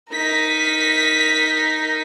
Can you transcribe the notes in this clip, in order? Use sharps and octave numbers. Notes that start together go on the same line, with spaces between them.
D#4 A#4 B6